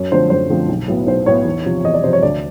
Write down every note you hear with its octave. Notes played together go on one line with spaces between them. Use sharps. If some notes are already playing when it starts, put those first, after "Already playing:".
Already playing: F#2 C#5
D3 F3 A3 C4 C5
F#2 C5
D3 F3 A3 C4
B1
A2 F#3 B3
B1 C5
A2 F#3 B3 C#5
E2
C3 F3
E2 D#5
D5
C3 F3 C5
C#5
D2 D5